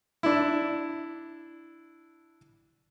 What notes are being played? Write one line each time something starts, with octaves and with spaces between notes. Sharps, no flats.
D4 E4